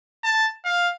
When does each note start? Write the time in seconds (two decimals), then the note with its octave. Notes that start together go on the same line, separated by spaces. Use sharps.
0.23 A5
0.65 F5